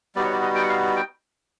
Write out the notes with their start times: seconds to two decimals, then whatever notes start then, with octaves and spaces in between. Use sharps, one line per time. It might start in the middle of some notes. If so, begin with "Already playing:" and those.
0.15 G3 B3 D#4 F#4 D5
0.24 C#5
0.33 D5
0.42 D#5
0.55 G5
0.62 F#5
0.69 F5
0.96 G5